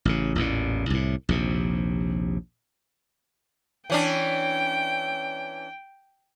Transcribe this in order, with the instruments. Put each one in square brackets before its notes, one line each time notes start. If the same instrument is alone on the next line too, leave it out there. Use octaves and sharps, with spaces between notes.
[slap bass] A1 C#3
A1 E2 A#2
C2 A2
A#1 D#2 C3
[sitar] E3 C#4 D4 [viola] G5